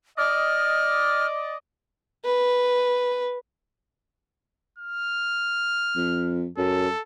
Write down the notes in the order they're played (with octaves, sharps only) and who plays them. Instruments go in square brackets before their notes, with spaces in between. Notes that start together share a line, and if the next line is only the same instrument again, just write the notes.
[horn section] D5 D#5 [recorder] F6
[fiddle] B4
[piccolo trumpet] F6
[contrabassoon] F2
[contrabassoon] F#2 [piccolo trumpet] A4